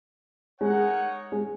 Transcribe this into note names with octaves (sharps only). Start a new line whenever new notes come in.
G#3 D#4 A#4 C#5 F#5
G#3